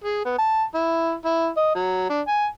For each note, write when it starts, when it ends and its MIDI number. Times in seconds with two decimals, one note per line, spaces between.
0.04 0.20 68
0.25 0.34 59
0.39 0.63 81
0.74 1.14 64
1.25 1.49 64
1.57 1.70 75
1.75 2.05 54
2.10 2.21 62
2.28 2.46 80